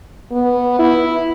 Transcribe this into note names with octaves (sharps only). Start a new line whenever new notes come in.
B3
E4